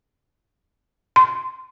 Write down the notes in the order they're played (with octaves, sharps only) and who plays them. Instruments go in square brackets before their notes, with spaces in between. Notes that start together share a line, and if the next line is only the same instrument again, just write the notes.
[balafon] C6